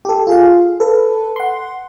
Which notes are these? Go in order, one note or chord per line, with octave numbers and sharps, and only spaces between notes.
G4 A4
F4 G#4 F5
A4 B4
F#5 C6